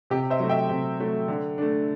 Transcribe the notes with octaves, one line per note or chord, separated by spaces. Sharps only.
C3 G4
C5 E5
F#3 A3
E5 G5
C3
F#3 A3
D3
A3 D4